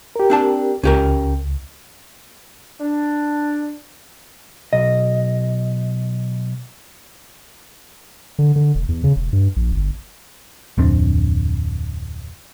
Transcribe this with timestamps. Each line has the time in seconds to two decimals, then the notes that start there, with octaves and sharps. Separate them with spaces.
0.16 G4 A#4
0.30 C4 D4 A5
0.83 C#2 C#4 G4 A#4
2.80 D4
4.73 B1 D#5
8.39 D3
8.56 D3
8.75 E1
8.89 E2
9.04 C#3
9.16 E1
9.33 G2
9.56 A#1
9.72 G1
10.78 D1 F2 C4 D4